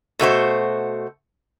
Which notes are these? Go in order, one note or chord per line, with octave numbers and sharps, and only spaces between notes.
B2 A3 F#4 C5